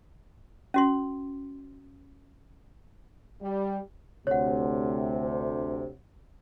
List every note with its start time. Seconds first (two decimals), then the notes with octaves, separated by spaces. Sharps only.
0.74 C#4 F#4 C6
3.42 G3
4.27 D2 C3 C#5 F#5